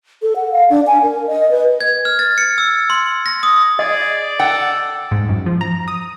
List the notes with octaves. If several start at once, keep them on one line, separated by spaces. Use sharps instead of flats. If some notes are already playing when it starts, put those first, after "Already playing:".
A4
F#5
F5
D4
G#5
A#4
D#5
B4
G#6
F6
A6
C#7
E6
C6
A#6
D#6
G#4 D5 D#5
A4 F#5 G5
G#2
F#2
F3
A#5
D#6